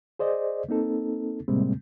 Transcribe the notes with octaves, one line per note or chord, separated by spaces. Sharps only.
G#4 C5 D5 D#5
A#3 C4 D#4 A4
A2 C3 G3 G#3 A#3 C4